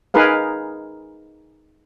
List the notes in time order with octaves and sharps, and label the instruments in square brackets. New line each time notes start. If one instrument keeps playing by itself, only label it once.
[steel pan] D#4 G#4 A#4 B4 F5